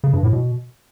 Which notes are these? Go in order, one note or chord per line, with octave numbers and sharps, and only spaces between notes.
C#3
G2
A2
B2